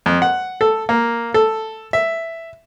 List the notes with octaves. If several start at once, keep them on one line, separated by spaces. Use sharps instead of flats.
F2
F#5
A4
A#3
A4
E5